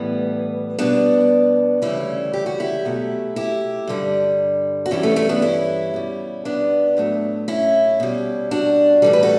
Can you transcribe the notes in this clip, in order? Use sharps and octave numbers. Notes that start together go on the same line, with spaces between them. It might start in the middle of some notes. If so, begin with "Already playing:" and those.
Already playing: A2 E3 G3 B3
B2 G3 B3 D4
D2 C#3 E3 G3 C#4 E4
G4
F#4
E4 G4
B2 F#3 A3
E4 G4
G2 D3 G3
F#4
G2 E3 G3 C#4 E4
A3 C#4
A3 C#4
B3 D4
C#4 E4
B2 G3
B3 D4
A2 F#3 A3
C#4 E4
B2 G3
D4 F#4
A2 E3 G3 A4
B4
F#4 A4